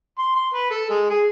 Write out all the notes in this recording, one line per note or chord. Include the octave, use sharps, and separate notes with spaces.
C6
C6
B4
A4
G#3
G#4